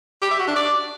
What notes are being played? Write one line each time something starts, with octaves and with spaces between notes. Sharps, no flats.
G4
E5
F#4
D4
D5